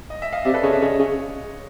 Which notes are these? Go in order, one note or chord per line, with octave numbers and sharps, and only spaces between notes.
D#5
E5
D#5 F5
C3 D5 E5
A4 B4
C#3 C#5 D#5
D5 E5
C#3 C#5 D#5
C#3